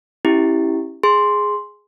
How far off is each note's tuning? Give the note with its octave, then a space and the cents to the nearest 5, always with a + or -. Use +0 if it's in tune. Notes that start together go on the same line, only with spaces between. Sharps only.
C#4 -30 E4 -5 G4 +0
G#4 +0 C6 +0